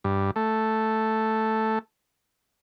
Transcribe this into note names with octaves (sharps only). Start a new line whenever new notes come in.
G2
A3